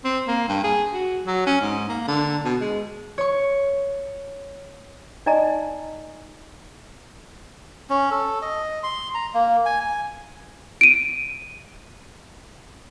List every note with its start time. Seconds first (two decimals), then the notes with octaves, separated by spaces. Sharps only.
0.04 C4
0.28 A#3
0.48 G2
0.64 G#4
0.92 F#4
1.27 F#3
1.46 C#4
1.61 G#2
1.89 A#3
2.07 D3
2.44 B2
2.61 G#3
3.18 C#5 C#6
5.26 D#4 D5 D#5 G#5 A#5
7.90 C#4
8.11 A4
8.42 D#5
8.83 C6
9.14 A#5
9.34 A#3
9.66 G#5
9.81 G#5
10.81 D7 D#7